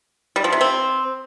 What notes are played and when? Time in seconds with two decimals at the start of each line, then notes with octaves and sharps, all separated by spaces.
0.36 G3
0.44 F3
0.52 C3
0.61 C4